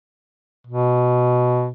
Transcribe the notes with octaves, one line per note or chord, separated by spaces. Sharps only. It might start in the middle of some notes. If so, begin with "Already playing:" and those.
B2